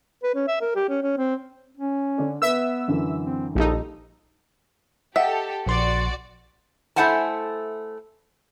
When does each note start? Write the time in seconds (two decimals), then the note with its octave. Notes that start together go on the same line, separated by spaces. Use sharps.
0.23 B4
0.35 C#4
0.48 E5
0.61 A#4
0.75 G4
0.89 C#4
1.02 C#4
1.17 C4
1.77 C#4
2.18 D3 D4
2.42 B3 B4 E5 E6
2.88 F#2 D3 E3
3.21 C4
3.55 A#1 G3 D#4 A4
5.16 G4 A4 D#5 E5 F#5 G5
5.67 A#1 F#4 D5 C6
6.96 A3 E4 C5 F#5 G#5 A5